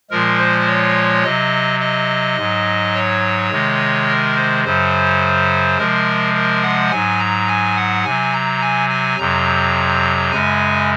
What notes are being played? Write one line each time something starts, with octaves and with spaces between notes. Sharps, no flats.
A#2 F3 G#3 A#4
C5
C#5
C3 F#3 D#5
D#5
G#2 F#3
C#5
C3 D#3 G#3
A#4
C5
F#2 C#3 F#3 C5
C3 F3 G#3 A#4
A#4
F#5
G#2 F#3 G#5
A#5
G#5
F#5
C3 F#3 G#5
A#5
G#5
G#5
F2 C3 F#3 A#5
F#2 C#3 G#3 G#5